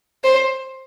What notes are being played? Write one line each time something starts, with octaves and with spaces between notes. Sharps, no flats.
C5